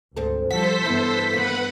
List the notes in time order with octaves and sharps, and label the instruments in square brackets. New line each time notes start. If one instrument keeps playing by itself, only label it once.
[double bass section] D2 [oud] G#2 C4 A4
[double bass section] F3 G3 [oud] F#4 [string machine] A4 C5 [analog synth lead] B6
[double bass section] G2 E3 B3 [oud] E4
[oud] D#3 A#3 [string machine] B4 F#5 B5